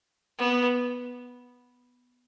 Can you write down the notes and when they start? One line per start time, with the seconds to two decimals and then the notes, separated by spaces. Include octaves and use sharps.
0.39 B3